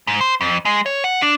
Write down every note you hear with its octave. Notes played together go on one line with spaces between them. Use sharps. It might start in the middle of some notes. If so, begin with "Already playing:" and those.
G#2
C5
F2
G#3
C#5
F#5
D4